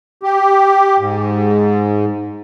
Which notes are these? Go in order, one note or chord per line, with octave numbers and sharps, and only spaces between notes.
G4
G#2